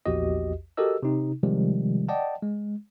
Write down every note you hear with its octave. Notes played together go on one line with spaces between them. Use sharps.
A#1 E2 F#4 G4 D#5
F#4 G4 A4 A#4 D#5 E6
C3 D#4
C3 D#3 F3 G3 G#3
D5 D#5 F#5 G5 A5
G#3